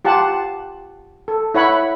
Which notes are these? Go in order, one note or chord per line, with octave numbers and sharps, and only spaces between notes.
F4 G4 F#5 A5
A4
E4 C#5 F#5 B5